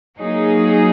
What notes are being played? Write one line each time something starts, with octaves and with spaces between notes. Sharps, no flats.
F#3 A#3 D#4 G#4